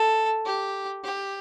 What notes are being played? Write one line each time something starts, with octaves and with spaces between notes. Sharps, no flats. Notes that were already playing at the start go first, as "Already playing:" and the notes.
Already playing: A4
G4
G4